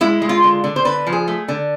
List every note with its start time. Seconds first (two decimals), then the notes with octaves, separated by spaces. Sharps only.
0.01 G#3 E4
0.22 G#3
0.29 F4
0.44 D3
0.64 D3
0.76 C5
0.85 D3 B4
1.07 F3
1.12 G#4
1.28 A3
1.48 D3